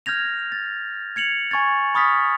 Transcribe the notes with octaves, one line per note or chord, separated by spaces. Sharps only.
F6 G6 G#6 A#6 F7
A6
G#6 C#7 F7 F#7
G#5 C#6 G#6 A6
B5 C#6 D#6 F6 A6 B6